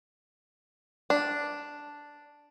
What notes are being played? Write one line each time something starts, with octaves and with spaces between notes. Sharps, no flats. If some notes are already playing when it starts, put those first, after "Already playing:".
D4